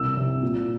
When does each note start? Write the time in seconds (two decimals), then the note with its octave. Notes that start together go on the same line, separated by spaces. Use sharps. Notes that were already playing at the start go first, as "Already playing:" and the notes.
Already playing: C2 E6
0.17 C3
0.42 A#2